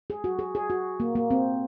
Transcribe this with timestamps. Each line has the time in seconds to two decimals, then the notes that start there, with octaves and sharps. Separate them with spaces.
0.10 G#4
0.24 F#4
0.39 G#4
0.55 G#4
0.70 F#4
1.00 A#3
1.15 A#3
1.31 C4